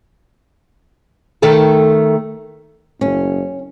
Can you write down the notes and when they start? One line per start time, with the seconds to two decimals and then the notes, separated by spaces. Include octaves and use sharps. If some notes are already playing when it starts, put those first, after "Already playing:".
1.42 D#3 A3 A4
3.01 F#1 C#4